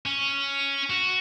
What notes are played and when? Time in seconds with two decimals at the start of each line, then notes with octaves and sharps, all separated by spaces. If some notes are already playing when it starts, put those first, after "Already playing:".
0.06 C#4
0.90 F#4